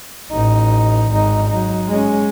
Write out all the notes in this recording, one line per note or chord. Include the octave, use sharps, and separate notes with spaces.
A1 D#4
G#1 D#4
F#3 D#4
G#3 C#4